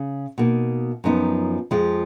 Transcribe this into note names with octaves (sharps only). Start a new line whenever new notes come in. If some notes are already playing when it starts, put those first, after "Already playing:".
Already playing: C#3
B2 A#3 D#4
F#2 F3 B3 D#4
F2 F3 G#3